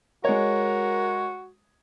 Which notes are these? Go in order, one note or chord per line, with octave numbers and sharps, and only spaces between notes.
G#3 F#4 A#4 C#5